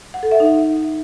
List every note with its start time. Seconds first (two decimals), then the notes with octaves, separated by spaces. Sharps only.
0.14 F#5
0.23 A4
0.31 E5
0.40 D#4